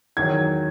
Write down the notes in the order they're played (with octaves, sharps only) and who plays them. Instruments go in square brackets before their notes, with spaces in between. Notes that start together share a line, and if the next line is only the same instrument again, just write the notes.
[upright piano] E2 D#3 F#3 G#6